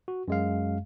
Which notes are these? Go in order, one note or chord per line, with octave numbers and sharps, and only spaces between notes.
F#4
F#2 G#3 F5